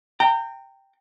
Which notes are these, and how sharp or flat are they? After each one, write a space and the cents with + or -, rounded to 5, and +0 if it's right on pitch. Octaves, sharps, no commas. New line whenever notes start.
G5 +0 A#5 -30